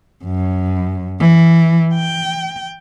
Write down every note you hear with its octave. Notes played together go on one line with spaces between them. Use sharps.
F#2
E3
G5